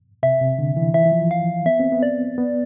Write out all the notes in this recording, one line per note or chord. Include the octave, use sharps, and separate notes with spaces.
C3 E5
C3
D3
E3
E3 E5
E3
F3
F5
B3 E5
C4
B3
D5
B3